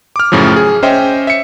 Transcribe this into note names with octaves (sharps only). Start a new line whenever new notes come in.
D6 F6
F#2 A2 C#3 F3
G#4
C#4 C5 D#5 E5 G5
E5 C#7